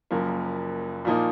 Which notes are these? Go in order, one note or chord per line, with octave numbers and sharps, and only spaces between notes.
F#1 F#2 F3 A#3
A#2 F3 A#3 D#4